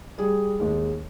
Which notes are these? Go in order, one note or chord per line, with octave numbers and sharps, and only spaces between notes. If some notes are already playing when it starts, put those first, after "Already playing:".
G3 G#4
D#2 G#3